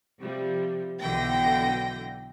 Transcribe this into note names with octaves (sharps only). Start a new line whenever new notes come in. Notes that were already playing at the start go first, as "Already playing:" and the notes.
C3 F3 G3
B1 B2 D3 E3 G5 A#6